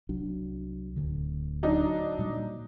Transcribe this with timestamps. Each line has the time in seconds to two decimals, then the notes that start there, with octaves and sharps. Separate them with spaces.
0.09 C2 F#3 D4
0.96 D1 D2 D3
1.63 F#3 D4 D#4
2.19 A#2 G3